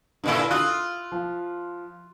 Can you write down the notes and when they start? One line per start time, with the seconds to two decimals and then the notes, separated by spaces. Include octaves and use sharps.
0.24 G2 A#2 D3 E4
0.51 F4 D#6 F#6
1.12 F3